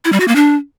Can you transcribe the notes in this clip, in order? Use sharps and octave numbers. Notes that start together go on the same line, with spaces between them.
E4
G3
F#4
A#3
D4